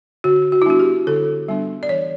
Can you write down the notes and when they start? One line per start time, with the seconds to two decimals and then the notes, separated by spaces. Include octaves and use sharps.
0.24 D3 F#4
0.52 F#4
0.62 E4
0.66 G3 B3 D4 F#4
0.79 G4
1.07 D3 A4
1.49 G3 B3 D4
1.83 D5
1.89 E3 C#5